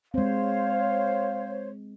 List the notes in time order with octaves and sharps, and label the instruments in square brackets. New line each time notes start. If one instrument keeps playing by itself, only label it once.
[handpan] G#3 C4 [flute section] C5 C#5 [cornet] F5